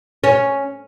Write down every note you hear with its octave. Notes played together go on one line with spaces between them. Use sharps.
C#4